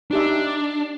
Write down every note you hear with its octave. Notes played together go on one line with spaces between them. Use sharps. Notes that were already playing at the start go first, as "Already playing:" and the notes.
D4 D#4 G4 E5